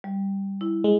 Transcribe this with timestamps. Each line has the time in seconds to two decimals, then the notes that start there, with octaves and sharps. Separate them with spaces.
0.04 G3
0.61 E4
0.84 G#3